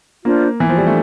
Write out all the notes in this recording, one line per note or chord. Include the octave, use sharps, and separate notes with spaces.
A#3 D4 F4 C5
E3
F3
G3
A3 D4